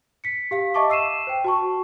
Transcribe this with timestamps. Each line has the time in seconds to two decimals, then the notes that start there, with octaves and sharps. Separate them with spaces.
0.24 B6 C#7
0.51 G4 F5 B6
0.74 D#5 E5 A5 C#6 D6
0.90 E6 C7 D#7 E7
1.27 C5 G5
1.44 F#4 A5 C#6